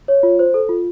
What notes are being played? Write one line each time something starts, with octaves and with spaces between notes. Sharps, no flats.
C#5
F4
C5
A4
F4